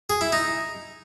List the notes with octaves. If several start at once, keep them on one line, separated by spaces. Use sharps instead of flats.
G#4
E4
D#4